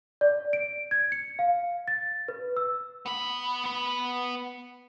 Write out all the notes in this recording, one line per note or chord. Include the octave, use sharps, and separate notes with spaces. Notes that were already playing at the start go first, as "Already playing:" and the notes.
D5
D7
G#6
C#7
F5
A6
B4
E6
B3 B5